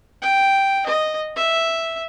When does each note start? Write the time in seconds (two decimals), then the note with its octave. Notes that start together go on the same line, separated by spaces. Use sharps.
0.22 G5
0.86 D#5
1.36 E5